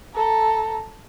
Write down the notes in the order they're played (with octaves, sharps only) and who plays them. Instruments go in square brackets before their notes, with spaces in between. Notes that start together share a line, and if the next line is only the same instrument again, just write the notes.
[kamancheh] A4 A#5